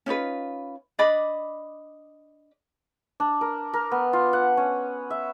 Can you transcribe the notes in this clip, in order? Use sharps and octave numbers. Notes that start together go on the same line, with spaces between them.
C#4 D#4 F4 B4
D4 D5 D#5 B5
D4
A#4
A#4
B3
F4
F#5
C#4
E5